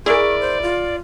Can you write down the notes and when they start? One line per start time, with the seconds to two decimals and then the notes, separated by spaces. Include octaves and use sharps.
0.06 E4 G#4 A#4 D5 C#6
0.40 C5
0.62 F4